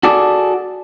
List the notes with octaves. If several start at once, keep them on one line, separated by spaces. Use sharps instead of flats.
F#4 G#4 A4 D5